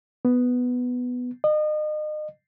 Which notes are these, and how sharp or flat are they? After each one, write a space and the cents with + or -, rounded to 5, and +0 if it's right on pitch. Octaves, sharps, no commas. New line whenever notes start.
B3 +5
D#5 -35